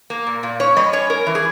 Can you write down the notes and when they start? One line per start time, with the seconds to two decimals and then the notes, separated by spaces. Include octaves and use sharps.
0.10 A#3
0.27 A#2
0.43 A#2
0.60 C#4 C#5
0.77 G3 D#5
0.93 C#4 C#5
1.10 C#4 A#4
1.27 E3
1.35 G#4